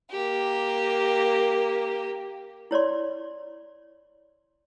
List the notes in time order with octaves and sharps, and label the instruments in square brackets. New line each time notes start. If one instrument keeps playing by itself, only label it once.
[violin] A#3 G4
[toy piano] E4 C#5 D5 C6